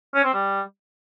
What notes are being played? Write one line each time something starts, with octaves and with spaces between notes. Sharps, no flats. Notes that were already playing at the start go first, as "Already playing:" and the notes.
C#4
C4
G3